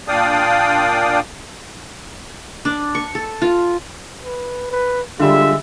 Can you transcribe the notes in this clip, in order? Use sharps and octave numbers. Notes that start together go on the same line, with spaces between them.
A#2 D4 D5 F5 G5 D#6
D4
C#6
A4
F4
B4
B4
D3 G3 G#3 F4 E5